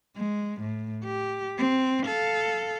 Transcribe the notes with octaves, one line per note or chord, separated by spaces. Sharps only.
G#3
A2
G4
C4
A4 F5